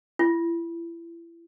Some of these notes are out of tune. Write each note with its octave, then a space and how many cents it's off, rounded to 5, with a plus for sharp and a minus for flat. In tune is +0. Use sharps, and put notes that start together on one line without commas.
E4 +35